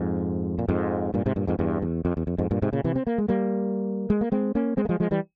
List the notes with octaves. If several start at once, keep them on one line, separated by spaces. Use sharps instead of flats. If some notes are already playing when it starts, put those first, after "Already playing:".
Already playing: F2 G#2
A#2
F2 G#2
G2 A#2
G#2 C3
G2 A#2
F2 G#2
E2 G2
E2
F2
E2
F2
F2 G#2
G2 A#2
G#2 C3
A#2 C#3
C3 E3
C4
A#3
G#3
G3 A#3
G#3
A#3
G#3 C4
A#3 C#4
G#3 C4
A#3
F3 G#3
F3 G#3
E3 G3